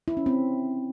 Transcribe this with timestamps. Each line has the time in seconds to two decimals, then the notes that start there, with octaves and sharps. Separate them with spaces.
0.08 E4
0.17 C#4
0.26 C4